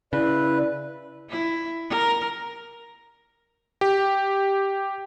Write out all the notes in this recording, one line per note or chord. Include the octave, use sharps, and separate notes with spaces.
C#3 E4 B4 D5
E4
A#4
G4